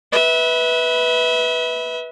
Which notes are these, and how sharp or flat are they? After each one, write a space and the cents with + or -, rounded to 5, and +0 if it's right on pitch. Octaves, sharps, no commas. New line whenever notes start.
B4 -5 E5 -30